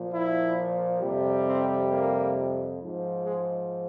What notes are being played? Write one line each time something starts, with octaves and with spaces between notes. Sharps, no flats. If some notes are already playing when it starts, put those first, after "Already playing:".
Already playing: A#2 F3
E4
F2 C3 G3
C4
A#3
G#2 F3
G#3